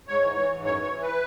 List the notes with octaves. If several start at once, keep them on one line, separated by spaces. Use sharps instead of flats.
G#2 C#5
E3
E3
G#2
F#2 C#5
E3
C#5
E3
B4